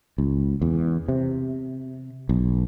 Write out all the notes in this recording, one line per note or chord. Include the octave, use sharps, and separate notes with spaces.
C#2
E2
C3
B1